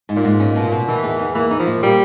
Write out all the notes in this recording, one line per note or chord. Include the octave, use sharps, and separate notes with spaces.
G#2
A#2
G#2
C#4
B2
B2
D#3 E3
E2
E2
E3 A#3
D#4
F3
A#2
G3 A#3